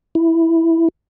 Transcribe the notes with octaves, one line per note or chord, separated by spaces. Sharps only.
E4